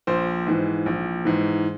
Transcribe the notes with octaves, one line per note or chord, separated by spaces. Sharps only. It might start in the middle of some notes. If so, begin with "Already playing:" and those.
A#1 C5
G#2 E3
A#1
G#2 E3